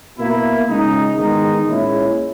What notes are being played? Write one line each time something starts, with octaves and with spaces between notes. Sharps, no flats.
B2 A#3 E4
C#2 C#3 G#3 D#4
E2 D#3 G#3 D#4
A#2 G#3 C#4 E4